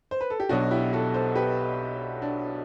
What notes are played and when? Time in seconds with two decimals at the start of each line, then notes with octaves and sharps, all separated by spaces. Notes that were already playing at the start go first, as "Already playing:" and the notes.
0.11 C5
0.21 B4
0.30 A4
0.40 G4
0.49 B1 B2 F#3 D4 F#4
0.71 E4 G4
0.93 F#4 A4
1.14 A4 C5
1.36 G4 B4
2.22 D4